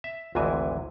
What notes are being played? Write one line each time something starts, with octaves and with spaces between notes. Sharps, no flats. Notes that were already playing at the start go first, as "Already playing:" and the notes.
E5
G#1 D2 G#2 C3 E3 G#5